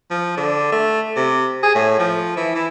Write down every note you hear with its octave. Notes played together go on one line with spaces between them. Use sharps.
F3
D3
A3
C3
G#4
A2
F3
E3
E3